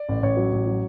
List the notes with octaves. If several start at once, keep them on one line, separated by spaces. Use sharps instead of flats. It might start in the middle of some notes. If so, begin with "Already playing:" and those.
Already playing: D5
A1
A1 C#5
F#3
A1
F#3